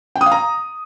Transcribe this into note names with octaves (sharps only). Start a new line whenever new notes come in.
G5
D#6
F5
A#5